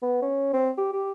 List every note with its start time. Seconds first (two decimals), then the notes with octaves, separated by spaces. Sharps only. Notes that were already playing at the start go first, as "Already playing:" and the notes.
0.02 B3
0.22 C#4
0.53 C4
0.78 G4
0.93 G4